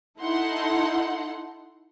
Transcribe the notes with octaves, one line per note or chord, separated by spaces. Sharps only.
D#4 E4 A4 F#5 C6